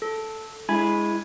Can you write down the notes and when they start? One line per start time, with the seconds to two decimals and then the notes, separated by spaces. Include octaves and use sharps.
0.02 A4
0.69 G#3 E4 G#5 B5 G#6